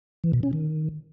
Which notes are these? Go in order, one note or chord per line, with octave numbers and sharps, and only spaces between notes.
E3
B2
C#4
D#3